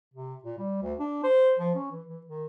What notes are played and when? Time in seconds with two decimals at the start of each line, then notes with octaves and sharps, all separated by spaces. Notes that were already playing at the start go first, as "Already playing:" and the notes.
0.14 C3
0.44 A#2
0.59 G3
0.82 D2
0.99 D4
1.24 C5
1.59 F3
1.75 C#4
1.91 E3
2.09 E3
2.27 D#3